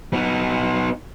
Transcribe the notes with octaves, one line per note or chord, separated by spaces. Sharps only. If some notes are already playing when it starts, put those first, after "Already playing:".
B3 D#4